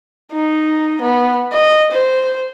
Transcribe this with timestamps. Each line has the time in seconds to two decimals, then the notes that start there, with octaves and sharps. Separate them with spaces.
0.32 D#4
1.02 B3
1.52 D#5
1.92 C5